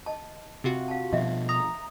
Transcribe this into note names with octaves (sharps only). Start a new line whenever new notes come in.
D#5 A5
C3 F4 F#4
F5 A5
B2 F3 D#5 E5
A#5 D#6